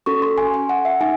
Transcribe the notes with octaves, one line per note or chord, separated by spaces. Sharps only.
C#4 F#4 A4 C#6
C6
G#5
G#5
F#5
E5
D#4 G#5